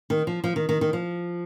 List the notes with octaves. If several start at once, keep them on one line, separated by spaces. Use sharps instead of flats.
D#3
F3
F3
D#3
D#3
D#3
F3